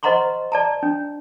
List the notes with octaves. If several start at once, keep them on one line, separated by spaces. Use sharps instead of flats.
C5 D#5 F#5 A#5 C6 C#6
D5 A5 A#5
D4